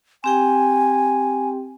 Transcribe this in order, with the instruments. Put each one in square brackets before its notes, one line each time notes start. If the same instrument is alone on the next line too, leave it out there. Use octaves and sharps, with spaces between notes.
[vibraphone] C4 G4 G5 [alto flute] G#5